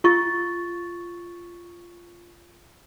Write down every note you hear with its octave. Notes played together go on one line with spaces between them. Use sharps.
F4 C#6 A6